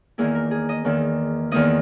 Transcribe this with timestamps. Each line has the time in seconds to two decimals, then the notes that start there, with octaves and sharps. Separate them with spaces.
0.18 E2 D#3 A#3 E4 G#4
0.35 A#4
0.51 G#4
0.69 D#5
0.85 E2 D#3 A#3 E4
1.51 E2 D#3 A#3 E4 D#5